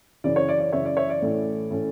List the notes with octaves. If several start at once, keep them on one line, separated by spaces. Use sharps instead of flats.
F#2 C#3 E3 D5
C#5
D5
D5
F#2 C#3 E3 C#5 E5
D5
C#5 E5
D5
A2 E3 A3 C#4 E4
A2 E3 A3 C#4 E4